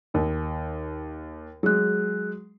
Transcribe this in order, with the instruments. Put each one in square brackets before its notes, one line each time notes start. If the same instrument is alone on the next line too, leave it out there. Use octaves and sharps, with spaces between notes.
[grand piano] D#2 D#3
[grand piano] F#3 G#3 [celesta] G#4 F#6